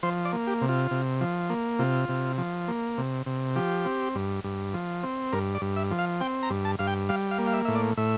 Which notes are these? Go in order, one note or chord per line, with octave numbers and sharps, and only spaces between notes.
F3 C5
D5
A#3
G4
C3
F4
C3
F3
A#3
C3 F4
C3
F3
A#3
C3
C3
F3 G4
C4
G2
G2
F3
C4
G2 A#4
D5
G2
E5
F3
F5
C4 G5
A#5
G2
A5
G2 F5
G5
G3 F5
F5
A#3
F5
E5
A2 E5
D5
A2 E5